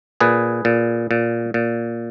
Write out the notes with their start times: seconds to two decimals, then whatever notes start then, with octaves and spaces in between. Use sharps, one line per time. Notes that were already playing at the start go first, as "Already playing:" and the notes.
0.20 A#2 G#4 B4
0.65 A#2
1.11 A#2
1.54 A#2